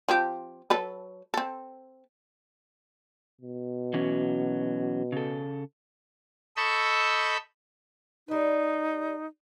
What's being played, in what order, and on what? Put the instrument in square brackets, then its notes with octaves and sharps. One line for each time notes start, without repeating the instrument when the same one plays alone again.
[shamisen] F3 C4 G4
F#3 A4 B4
C4 A4
[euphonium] B2
[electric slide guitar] E3 F#3 C#4
C#3 A4
[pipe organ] A4 D#5 B5 C#6 E6 G6
[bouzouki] G3 B4 [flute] D#4